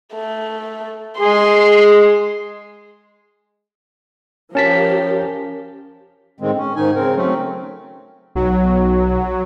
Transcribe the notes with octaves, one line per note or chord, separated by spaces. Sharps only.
A3
G#3 G#4 C6
F3 C#4 G4 A#4 A5 B6
A2 D#3 G#3 C4
C#4
G#2 D#3 D#4 G#5
C#3 C4 A#4
F#3 A3 C4 C#4
B1 F#3